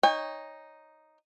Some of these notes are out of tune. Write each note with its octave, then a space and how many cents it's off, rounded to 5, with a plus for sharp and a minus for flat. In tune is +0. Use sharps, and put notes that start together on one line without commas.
D#4 +0 C#5 +0 G5 +45